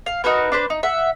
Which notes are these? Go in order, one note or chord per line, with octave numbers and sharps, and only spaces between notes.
F5
D#4 F#4 A#4 B4
D4 B4 C5
D#4
E5 F#5